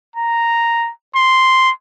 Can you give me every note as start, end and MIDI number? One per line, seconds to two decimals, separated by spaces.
0.16 0.91 82
1.16 1.72 84